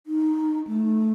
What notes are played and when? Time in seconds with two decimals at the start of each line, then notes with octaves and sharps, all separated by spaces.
0.07 D#4
0.67 A3